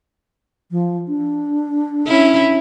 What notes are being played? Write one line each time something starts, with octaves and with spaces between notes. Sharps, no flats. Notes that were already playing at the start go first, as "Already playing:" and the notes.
F3
D4
C#4 E4